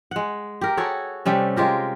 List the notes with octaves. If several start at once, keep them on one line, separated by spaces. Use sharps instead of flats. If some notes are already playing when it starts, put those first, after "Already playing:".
G#3 F#5
G4 A#4
F#4 G#4 A4 C#5
C3 G3 A3 C#4
G#3 F4 G4 A#4